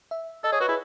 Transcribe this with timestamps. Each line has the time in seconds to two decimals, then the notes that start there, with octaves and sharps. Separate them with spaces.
0.11 E5
0.44 A4 D#5
0.52 G#4 C#5
0.61 F#4 B4
0.69 E4 G#4